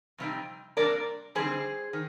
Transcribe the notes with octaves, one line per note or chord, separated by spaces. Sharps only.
F2 C3 G3 C4 D#4
C3 G3 A#3 D4 A#4 D5
D3 G3 C4 D#4 G#4 C5
D#3